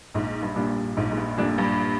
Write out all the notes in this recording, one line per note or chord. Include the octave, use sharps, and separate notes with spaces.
A#1 G#2
G2
A#2 G3 D4
A#1 G#2
G#2
G2
F2 A#2 G3 D4
G2